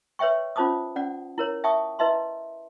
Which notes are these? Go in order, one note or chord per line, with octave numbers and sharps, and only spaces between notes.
B4 C#5 E5 G5 C#6
C#4 F4 C5 A5 D6 D#6
C#4 D5 F#5
E4 A#4 C#5
E5 G5 A5 C#6 D#6
E4 B4 D#5 E5 A5 C6